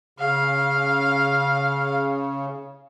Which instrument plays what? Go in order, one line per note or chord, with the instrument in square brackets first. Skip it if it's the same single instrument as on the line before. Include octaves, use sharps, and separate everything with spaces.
[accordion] C#3 [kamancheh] F5